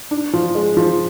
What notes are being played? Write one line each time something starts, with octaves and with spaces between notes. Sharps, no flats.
D4
F3
G#3
F3